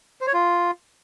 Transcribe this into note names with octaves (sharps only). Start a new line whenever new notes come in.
C5
C#5
F4